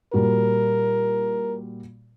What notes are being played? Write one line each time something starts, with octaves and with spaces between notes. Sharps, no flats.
A#2 G3 F#4 A#4